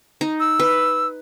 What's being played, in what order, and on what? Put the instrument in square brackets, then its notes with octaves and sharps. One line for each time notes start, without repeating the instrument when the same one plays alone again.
[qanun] D#4
[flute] E6
[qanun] B4